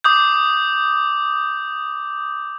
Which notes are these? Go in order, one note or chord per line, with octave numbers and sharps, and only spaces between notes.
D6 D#6 G6